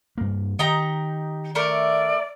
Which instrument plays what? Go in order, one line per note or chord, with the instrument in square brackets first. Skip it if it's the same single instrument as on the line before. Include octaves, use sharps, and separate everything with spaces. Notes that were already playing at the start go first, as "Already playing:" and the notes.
[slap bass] G2 A#3
[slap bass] D#3 [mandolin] D#4 G4 A#5
[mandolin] A3 A#4 [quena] D5